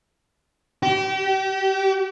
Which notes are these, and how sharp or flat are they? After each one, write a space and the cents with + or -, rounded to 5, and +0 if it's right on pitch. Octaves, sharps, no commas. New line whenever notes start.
G4 -35